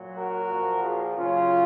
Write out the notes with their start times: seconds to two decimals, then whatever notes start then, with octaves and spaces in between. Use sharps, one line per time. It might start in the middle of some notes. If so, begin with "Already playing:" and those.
Already playing: A#2 F#3
0.18 F#4 A#4
0.51 A#2 F3
0.83 F4 G#4
1.17 C#3 F#3 C#4 F4